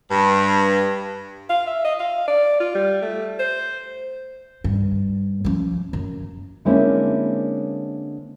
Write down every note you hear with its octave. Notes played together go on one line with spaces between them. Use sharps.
G2
F5
E5
D#5
F5
D5
F4
G3
A3
C5
G2
F3 C#4
F#2
D3 G#3 A#3 C4 C#4 E4